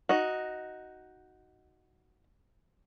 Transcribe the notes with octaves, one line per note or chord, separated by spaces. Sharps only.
D#4 F#4